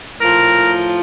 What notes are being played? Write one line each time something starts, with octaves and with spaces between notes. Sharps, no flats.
A2 F3 A#4